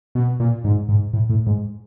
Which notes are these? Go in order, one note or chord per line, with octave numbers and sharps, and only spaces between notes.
B2
A#2
G#2
G#2
A2
A2
G#2